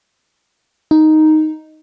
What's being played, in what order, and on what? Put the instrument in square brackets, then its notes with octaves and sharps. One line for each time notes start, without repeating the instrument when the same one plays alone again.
[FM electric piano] D#4